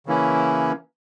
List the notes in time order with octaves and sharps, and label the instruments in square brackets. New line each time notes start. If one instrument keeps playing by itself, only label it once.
[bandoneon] C#3 E3 A#3 C#4 E4